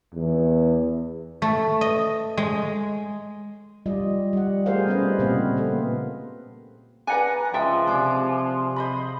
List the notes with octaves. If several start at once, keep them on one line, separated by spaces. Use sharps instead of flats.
E2
A3
D#5
G#3
G3 F4 D5 D#5
G3 F#5
A3 G4 G#4 A#4 C5 F5
G3 B3 C#4 B4 D#5
A#2 C#3 A#3 C4 G4 F5
A#3 B3 A4
D4 B4 F#5 G#5 A#5
C#2 F3 D#5 E5 G5 A5
C3 D4 G#4 D6
C5 D#5 B5